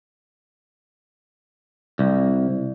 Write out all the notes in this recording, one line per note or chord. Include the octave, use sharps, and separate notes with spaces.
C2